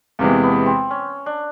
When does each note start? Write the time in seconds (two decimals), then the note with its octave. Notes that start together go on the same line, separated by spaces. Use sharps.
0.19 E2 C3 E3 G#3 A#3
0.43 B3
0.66 C4
0.91 C#4
1.26 D4